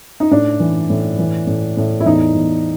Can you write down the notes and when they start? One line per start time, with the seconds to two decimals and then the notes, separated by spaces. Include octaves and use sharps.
0.20 D#4
0.31 A2 D4
0.60 E3
0.90 A2
1.19 E3
1.47 A2
1.77 A2
2.01 E4
2.06 E2 D#4
2.35 E2